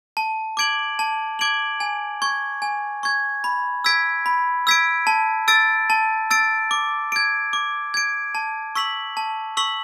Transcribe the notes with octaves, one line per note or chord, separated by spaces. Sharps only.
A5
D6 G#6 D7 F#7
A5
D6 G#6 D7 F#7
G#5
C#6 G#6
G#5
C#6 G#6
B5
E6 G#6 B6 D7
B5
E6 G#6 B6 D7
A5
E6 A6 D7
A5
E6 A6 D7
D6
G#6 D7
D6
G#6 D7
A5
C#6 E6 B6 F#7
A5
C#6 E6 B6 F#7